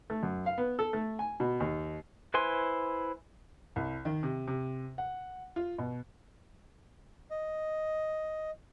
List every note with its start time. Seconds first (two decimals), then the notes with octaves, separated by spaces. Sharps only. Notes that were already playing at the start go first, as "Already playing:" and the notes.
0.10 A3
0.23 F#2
0.46 F5
0.58 B3
0.79 A4
0.93 A3
1.19 G#5
1.40 B2
1.60 D#2
2.34 E4 B4 C5 G#5 C6
3.76 C2
4.05 D#3
4.23 C3
4.47 C3
4.98 F#5
5.56 F4
5.78 B2
7.31 D#5